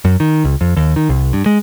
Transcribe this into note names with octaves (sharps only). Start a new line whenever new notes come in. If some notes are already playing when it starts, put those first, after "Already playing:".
F#2
D#3
C#2
F2
D#2
D#3
C2
G2
G#3